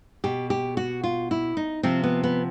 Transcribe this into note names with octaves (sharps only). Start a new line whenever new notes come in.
B2 G4
G4
F#4
F4
E4
D#4
C3 F3 C4
B3
B3